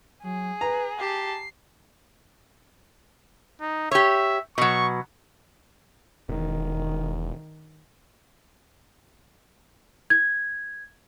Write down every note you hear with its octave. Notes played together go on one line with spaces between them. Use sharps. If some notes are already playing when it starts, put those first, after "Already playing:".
F#3 G#4
B4 A#5
G4 A5 C7
D#4
G4 C#5 E5
B2 F#3 C#6
E1 D#3
G#6